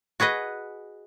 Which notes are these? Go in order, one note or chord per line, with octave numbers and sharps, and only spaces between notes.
F#4 G#4 B4 D#5